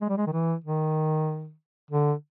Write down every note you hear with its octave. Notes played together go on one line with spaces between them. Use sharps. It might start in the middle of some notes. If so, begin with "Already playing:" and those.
G#3
G3
G#3
D#3
E3
D#3
D3